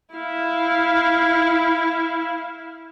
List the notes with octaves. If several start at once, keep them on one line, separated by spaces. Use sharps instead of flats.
E4 F5